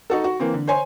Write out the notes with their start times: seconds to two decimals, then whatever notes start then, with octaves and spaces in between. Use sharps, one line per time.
0.10 D#4 F#4 A4
0.24 F#4
0.40 E3 A#3 C4
0.53 D3
0.67 C5 C#5 G#5 C6